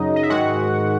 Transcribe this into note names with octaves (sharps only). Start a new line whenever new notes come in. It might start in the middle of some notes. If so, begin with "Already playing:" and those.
Already playing: F#2 C#3 F#3 D#4 D#5
D#5
E5
G#2 D#3 G#3 F#4 F#5